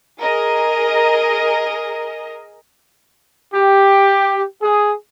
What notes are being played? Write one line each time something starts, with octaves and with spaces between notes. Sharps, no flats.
G#4 A#4 D#5
G4
G#4